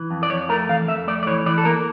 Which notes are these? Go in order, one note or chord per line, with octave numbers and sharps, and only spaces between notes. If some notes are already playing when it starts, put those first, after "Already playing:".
Already playing: E3
F2
D5
F2 C#5
A3 A#4
E3 F5
F2 E5
A3 D5
D5
E3 C#5
E3 D5
A4
A#3 A#4